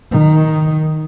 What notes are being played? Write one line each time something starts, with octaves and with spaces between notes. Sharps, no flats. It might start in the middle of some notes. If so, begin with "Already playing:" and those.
D#3